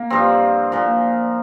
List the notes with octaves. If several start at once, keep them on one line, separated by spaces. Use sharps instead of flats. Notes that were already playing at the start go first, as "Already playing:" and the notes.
Already playing: A#3
G2 F3 C4
A#2 F3